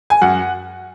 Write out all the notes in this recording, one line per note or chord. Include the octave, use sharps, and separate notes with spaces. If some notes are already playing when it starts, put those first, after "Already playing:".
G#5
F#2 F#5